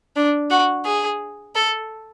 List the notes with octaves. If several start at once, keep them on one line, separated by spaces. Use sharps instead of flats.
D4
F#4
G#4
A4